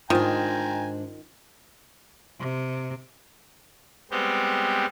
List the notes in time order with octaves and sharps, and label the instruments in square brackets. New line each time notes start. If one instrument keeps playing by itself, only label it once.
[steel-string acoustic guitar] G#2 D4 [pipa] D#3 [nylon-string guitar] F4 [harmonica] G5 G#5 A#5
[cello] C3
[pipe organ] G3 G#3 B3 C4 G4